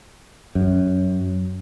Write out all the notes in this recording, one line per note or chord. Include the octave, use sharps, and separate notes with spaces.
F#2